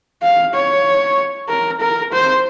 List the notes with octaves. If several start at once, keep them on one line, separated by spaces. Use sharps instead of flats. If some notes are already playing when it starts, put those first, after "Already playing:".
F5
C#5
A#4
A#4
C5